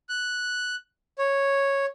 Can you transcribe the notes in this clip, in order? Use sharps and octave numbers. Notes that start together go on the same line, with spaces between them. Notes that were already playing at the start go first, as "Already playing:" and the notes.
F#6
C#5